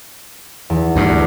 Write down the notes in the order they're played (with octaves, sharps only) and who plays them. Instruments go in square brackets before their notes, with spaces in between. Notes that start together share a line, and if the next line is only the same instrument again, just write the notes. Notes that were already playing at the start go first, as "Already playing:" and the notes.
[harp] E2
[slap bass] D2 G2